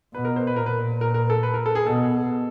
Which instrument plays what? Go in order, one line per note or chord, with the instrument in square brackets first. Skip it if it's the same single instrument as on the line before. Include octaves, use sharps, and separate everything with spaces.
[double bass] B2 [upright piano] B4
[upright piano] A#4
C5
B4
[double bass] A#2 [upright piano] A#4
[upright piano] B4
A#4
A#4
A4
B4
A#4
A4
G#4
[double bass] B2 [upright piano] A4